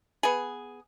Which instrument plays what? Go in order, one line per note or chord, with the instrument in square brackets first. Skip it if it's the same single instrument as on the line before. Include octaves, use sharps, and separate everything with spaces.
[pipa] B3 G#4